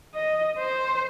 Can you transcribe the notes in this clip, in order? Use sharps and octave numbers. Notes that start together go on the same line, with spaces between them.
D#5
C5